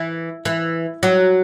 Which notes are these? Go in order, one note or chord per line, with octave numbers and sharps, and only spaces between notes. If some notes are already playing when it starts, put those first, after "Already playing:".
Already playing: E3
E3
F#3